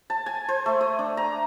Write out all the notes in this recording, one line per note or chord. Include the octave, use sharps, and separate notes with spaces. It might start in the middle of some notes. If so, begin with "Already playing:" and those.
A5
G#5
C5
A3
D#5
D4
A#5